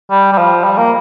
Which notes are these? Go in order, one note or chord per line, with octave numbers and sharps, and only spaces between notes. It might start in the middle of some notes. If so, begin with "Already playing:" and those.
G3
G3
F3
G3
A#3